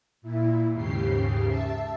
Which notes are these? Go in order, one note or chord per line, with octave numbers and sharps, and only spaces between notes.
A#2 E4
D#2 G#2 C#3 G4 C7
E5 A5